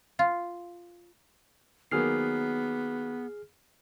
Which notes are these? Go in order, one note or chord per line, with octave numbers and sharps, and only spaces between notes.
F4
D#3 F#3 A#3 B3 G#4 F6 C7